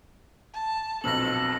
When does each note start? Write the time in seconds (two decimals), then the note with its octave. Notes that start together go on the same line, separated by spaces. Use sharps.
0.54 A5
1.04 B1 F2 B2 A4 A#6 F#7